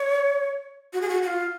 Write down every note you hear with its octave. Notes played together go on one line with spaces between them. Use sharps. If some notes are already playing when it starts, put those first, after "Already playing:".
Already playing: C#5
F#4
G#4
F#4
F#4
F4